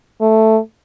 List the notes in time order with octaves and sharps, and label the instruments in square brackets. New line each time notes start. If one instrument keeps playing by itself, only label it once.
[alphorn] A3